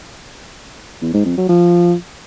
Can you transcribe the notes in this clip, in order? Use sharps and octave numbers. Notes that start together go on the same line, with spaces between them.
E2
G#2
F2
F#3
F3